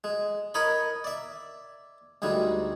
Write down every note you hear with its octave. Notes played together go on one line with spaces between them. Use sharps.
G#3
A#4 C#5 D#5 B5
D5 E5
D2 G#2 G3 G#3